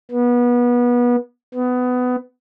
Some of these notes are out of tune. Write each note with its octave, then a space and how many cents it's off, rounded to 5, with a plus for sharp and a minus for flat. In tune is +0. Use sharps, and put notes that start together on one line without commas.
B3 -25
B3 +20